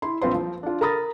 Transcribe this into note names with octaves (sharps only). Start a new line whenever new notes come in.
E4 C6
A#1 C4 F4 B4 C5 C6
F3
D4 F4
A#4 A#5 B5 D#6 A6 A#6